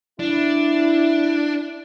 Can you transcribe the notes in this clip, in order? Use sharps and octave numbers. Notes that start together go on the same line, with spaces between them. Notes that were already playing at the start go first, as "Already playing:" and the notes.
D4 E4